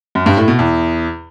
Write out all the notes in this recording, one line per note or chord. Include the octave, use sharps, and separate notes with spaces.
F#2
G2
A2
B2
E2